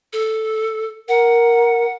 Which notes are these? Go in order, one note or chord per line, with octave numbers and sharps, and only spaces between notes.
A4
A#4 F#5